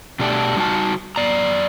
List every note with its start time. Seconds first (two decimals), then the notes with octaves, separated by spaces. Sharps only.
0.19 B2 A3 D4 G4 A4 A5
0.57 G3 D#4 F#4 A5
1.16 F#2 D5 A#5